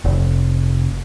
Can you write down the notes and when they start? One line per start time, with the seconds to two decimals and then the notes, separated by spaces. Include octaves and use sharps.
0.04 F1